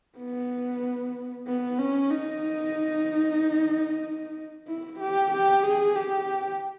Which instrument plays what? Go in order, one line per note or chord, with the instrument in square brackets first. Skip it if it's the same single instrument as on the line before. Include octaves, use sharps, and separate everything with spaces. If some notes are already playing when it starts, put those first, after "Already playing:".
[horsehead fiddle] B3
B3
C#4
D#4
E4
G4
G4
G#4
G4